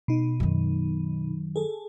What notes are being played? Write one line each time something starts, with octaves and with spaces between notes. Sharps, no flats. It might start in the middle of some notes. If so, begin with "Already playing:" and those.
B2 D#4
F#2 D#3
G#4 A4